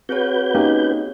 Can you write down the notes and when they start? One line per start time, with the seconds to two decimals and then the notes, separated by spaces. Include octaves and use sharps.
0.09 C4 F#4 G#4 B4 C#5 G6
0.54 A#3 C#4 D#4 G4